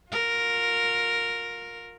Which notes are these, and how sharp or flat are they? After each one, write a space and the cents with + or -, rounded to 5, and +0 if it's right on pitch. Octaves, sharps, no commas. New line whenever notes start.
F4 +35 A#4 +0